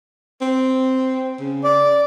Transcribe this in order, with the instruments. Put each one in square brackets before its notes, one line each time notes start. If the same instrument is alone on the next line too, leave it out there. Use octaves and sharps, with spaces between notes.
[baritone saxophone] C4
C#3
[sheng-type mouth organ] D5